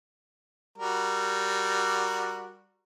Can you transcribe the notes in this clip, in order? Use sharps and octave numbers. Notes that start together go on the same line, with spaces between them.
G3 F#4 A#4